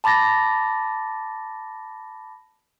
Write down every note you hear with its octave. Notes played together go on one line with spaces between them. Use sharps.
A5 B5 D6 A6 A#6